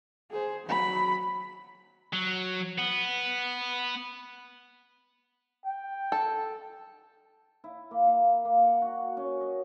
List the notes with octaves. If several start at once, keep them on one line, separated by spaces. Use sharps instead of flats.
G#4 C5
F#3 B5
F#3
B3
G5
A4
E4
A#3
F5
A#3
F#5
F#4
C#4
D#5